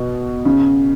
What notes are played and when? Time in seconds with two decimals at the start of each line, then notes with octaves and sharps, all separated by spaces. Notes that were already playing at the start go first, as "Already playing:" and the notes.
Already playing: B2
0.45 C#3